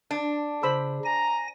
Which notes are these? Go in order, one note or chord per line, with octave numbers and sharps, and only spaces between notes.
D4 A5
C#3 C5 B5 E6
G#5 A#5 A#6